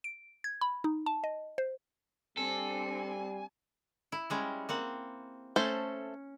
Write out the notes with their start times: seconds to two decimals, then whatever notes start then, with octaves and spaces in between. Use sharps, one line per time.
0.04 D7
0.44 G#6
0.61 B5
0.84 D#4
1.06 A5
1.24 D#5
1.58 C5
2.37 G3 C4 D4 A4 G#5
4.12 E4
4.30 G3 G#3 C#4
4.69 A#3 C4 F#5
5.56 A3 C#4 A4 C5